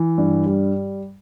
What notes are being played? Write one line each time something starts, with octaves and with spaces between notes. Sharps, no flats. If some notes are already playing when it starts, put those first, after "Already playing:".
Already playing: E3
G2
G3